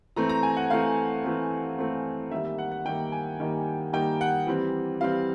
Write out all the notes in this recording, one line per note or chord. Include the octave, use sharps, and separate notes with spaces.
E3 A3 C4 A#5
A#5
G#5
F#5
E3 A3 C4 F5
E3 A3 C4
E3 A3 C4
D#3 G3 A#3 E5
E5
F#5
F#5
D#3 G3 A#3 G5
G#5
D#3 G3 A#3
D#3 G3 A#3 G5
F#5
E3 G3 C4
E3 G3 C4 F5